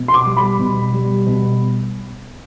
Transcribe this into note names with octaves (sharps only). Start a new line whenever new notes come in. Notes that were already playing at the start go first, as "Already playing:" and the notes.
Already playing: B2
C6
D6
G3
B5
B2
G3
B2